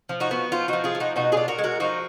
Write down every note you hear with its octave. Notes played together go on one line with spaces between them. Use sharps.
F3
D#4 F#4
B3
F3 F4
F3 D#4 F#4
F4 G#4
F3
D#4 F#4
B2 D#4 F#4
D4 F4 G#4
F#4 A#4
G#3
F#4 A#4
F3 D#4 F#4